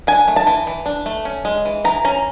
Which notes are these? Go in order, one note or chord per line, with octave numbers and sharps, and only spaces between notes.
D4 G#5
A3
A5
E3
E3
D4
A3
C#4
G#3
E3
E3 A#5
C#4 A#5